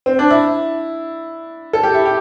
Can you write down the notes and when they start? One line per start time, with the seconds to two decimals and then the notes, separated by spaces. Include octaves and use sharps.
0.06 C4
0.19 D4
0.30 E4
1.73 A4
1.83 G4
1.94 E4
2.05 G4